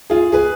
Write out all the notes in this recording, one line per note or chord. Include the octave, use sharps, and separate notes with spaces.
F4 G#4
G#4 B4